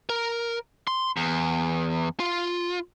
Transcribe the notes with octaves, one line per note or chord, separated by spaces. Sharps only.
A#4
C6
E2
F4